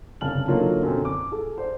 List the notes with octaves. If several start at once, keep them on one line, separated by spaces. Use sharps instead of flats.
G1 C2 C#3 A5 F6 F#7
D3 F#3 A#3 D#4 F4
F#2 B2 D3 C4
D6
G#4 A4
C5 D5